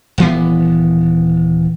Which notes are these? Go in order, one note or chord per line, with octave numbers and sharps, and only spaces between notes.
D#1 E3 B3